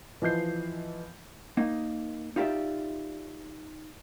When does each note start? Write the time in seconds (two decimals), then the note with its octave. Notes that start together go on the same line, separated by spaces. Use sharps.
0.22 E3 F3 D#5 G6 C7
1.57 A#3 D#4 D#5
2.36 D#4 F4 G4 B4 D5 E5